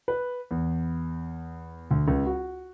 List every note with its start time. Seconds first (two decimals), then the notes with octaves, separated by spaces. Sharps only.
0.08 B4
0.51 E2
1.91 D2
2.08 C#2
2.26 F#4